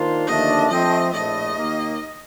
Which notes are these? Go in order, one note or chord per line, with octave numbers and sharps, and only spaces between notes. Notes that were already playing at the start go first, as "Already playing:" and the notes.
Already playing: D#3 A#3 D4 F4 C5
D#2 D3 F3 A3 D4 D#5
F3 A3 C4 D#5
A#1 A2 A3 D#5
D#2 D#3 A#3